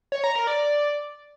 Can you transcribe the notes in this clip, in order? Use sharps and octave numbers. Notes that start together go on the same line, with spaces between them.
C#5
A#5
A#4
D5